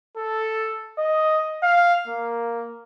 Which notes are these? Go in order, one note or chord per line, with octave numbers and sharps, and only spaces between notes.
A4
D#5
F5
A#3